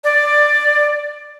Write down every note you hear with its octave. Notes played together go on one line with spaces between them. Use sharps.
D5